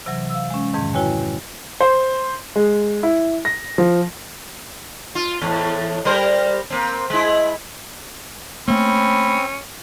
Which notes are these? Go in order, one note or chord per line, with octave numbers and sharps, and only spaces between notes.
C3 E3 F#3
F5 E6
G#3 C#4
F2 G#2 B2 D#3
E4 F#4 B4 C#5 G5 G#5
C5
G#3
E4
A#6
F3
F4
E2 A2
G3 A#4 C5
A#3 C4
G#3 E4
A3 A#3 C4 C#4 B5